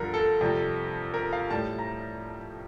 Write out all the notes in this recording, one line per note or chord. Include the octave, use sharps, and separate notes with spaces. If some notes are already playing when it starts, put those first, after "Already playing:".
Already playing: G2 D3 F3 A#4
A4
F2 C3 G3
A#4
F5
A2 G3 A5
A#5